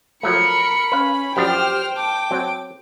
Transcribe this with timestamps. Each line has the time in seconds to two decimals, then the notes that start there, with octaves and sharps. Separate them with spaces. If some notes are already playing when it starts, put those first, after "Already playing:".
0.23 F3 F#3 A3 A#4 B5 C#7
0.92 C#4 B4 F5
1.37 F#2 F3 D4 G4 C5 G5 F6
1.97 A5 D6
2.31 F#3 C4